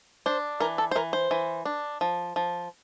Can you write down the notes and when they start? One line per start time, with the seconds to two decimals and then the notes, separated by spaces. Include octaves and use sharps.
0.26 D4 C5
0.60 E3 A#4
0.78 A4
0.91 C5
0.95 E3 A#4
1.13 C5
1.31 E3
1.65 D4
2.01 F3
2.36 F3